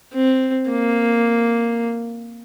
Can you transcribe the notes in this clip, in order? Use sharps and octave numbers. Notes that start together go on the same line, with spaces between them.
C4
A#3